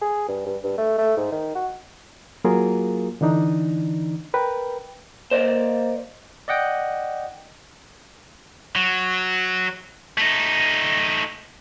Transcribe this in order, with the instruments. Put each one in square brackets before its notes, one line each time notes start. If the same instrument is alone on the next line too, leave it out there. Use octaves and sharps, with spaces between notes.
[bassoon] G#4
G2
G2
G2
A3
A3
G#2
D#3
F#4
[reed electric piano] F#3 A#3 F4 G#4 A#4
D3 E3 D4 D#4
A#4 B4 G5
[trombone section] A#3 [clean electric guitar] C5 D5 D#5
[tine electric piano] D5 D#5 F#5 G5
[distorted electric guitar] F#3
A3 D#4